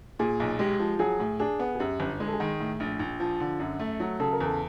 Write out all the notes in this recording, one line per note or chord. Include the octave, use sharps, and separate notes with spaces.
A#2 G#4
B1
G#3 G4
F3
F#3 G#4
A2
D4 G#4
B3
G#4
F#2 G4
G1
G#3
A4
G#4
D#3
A2
A#1
A#1
F3
D3
F#2
A3
F#3
C#3 A4
A#4
E2 A4